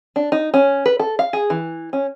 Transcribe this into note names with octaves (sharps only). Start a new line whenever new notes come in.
D4
D#4
C#4
B4
A4
F5
G#4
E3
C#4